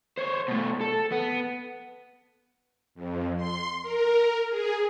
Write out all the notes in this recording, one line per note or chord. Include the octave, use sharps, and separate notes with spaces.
C5 C#5
B2 A3
A4
B3
F2
C6
A#4
G#4